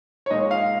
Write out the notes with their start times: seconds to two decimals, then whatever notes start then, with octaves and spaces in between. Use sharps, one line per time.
0.26 C#5
0.30 A#2 G#3 D#4 D#5
0.51 F5